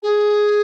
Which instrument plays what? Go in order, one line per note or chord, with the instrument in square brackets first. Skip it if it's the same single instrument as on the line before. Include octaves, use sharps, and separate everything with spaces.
[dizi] G#4